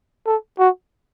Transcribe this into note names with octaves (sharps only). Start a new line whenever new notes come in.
A4
F#4